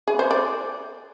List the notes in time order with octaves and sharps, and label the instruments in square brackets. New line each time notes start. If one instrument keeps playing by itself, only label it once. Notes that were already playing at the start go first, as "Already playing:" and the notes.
[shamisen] G#4
C5
D5